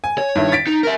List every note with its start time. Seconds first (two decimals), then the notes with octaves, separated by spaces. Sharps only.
0.04 G#5
0.18 C#5
0.35 G2 D#3 E4
0.52 A6 B6 D7
0.67 D#4
0.83 A#4 E5